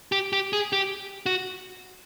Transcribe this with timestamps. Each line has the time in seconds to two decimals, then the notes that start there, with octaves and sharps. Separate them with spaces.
0.12 G4
0.33 G4
0.53 G#4
0.72 G4
1.26 F#4